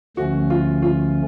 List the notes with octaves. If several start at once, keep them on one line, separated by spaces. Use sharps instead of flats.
D2 D3 F3 A3 C#4 F#4
F4
F4